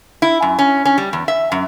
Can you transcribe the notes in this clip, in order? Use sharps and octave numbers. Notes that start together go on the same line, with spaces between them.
E4
F#2
C#4
C#4
G3
E2
E5
F#2